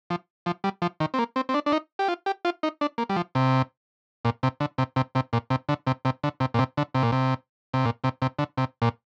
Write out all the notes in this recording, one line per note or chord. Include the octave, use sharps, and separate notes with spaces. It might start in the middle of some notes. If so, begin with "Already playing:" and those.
F3
F3
G3
F3
D#3
C4
A#3
C4
C4
D4
D4
D#4
G4
F4
G4
F4
D#4
D4
A#3
G3
F3
C3
A#2
C3
D3
C3
C3
C3
A#2
C3
D3
C3
C3
D3
C3
A#2
C3
D3
C3
A#2
C3
C3
A#2
C3
C3
D3
C3
A#2